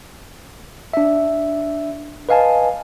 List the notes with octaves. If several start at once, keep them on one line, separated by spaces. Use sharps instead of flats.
D4 E5
B4 D#5 F5 G#5 A5